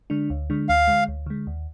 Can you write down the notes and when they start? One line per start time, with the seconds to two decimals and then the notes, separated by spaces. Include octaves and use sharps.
0.10 D3 G#3 D4
0.30 D2
0.50 D3 G#3 D4
0.69 D2 F5
0.88 D3 G#3
1.08 D2
1.26 D3 G#3
1.47 D#2